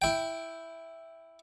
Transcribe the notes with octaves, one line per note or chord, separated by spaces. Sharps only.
E4 G5